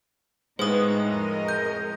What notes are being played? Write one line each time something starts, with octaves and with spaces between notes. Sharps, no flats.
A2 G#3 B3 D#4 F4 B4 C5 D#6
F2 A#4 D#5
G6